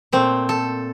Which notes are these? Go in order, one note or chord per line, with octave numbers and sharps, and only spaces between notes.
A#2 A3 C4
A4